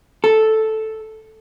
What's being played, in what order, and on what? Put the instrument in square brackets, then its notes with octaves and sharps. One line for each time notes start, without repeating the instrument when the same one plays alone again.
[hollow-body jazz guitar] A4